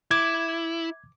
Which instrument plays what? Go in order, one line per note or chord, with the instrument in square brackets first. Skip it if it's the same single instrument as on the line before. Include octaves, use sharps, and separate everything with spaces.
[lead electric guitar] E4 [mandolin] D6 [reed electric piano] G#6